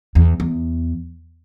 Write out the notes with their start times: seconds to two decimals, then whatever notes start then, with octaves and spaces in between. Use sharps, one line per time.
0.15 E2
0.40 E2